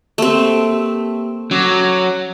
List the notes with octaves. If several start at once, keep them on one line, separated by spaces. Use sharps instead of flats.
A3 A#3 C4 G4
F#3 C#4 D6 A#6